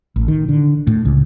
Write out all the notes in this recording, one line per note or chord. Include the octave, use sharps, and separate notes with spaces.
A1
D#3
D3
A2
C#2